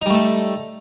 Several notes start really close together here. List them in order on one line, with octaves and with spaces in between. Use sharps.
D#4 G3 A3 A4